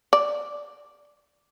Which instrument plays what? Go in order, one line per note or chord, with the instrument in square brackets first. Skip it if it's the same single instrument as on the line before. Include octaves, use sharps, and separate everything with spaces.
[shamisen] D5